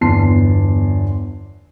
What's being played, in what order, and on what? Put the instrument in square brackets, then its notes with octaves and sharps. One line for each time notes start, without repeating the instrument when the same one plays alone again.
[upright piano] G1 E2 A5 C6 C7